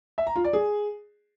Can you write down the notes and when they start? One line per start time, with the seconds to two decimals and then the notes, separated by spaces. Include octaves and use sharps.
0.18 E5
0.27 A#5
0.36 F4
0.44 D5
0.53 G#4